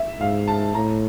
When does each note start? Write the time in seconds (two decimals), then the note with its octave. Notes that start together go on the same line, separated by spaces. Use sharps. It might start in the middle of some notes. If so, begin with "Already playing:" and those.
Already playing: E5
0.20 G#2 F5
0.48 A5
0.74 A2 A#5